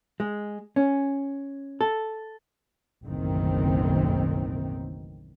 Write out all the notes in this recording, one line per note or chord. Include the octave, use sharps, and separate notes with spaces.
G#3
C#4
A4
F#1 B1 A2 D#3 E3 C4